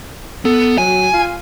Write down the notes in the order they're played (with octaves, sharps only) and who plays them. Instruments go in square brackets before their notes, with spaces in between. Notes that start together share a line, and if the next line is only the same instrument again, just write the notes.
[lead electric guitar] B3 [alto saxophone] A4
[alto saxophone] F#3 [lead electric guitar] G#5
[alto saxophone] F4